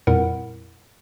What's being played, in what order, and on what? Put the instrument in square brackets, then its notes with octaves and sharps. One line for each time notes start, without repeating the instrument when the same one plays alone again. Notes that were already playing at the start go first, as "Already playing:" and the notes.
[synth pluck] F2 A#2 G3 E4 A#4 F#5